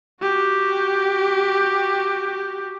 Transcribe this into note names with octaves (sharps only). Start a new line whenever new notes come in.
F#4 G4